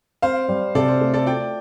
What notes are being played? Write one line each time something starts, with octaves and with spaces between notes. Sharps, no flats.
C4 C5 F5
G3
C3 A4 D5
C5
A3
A4 D5
F4 D5 G5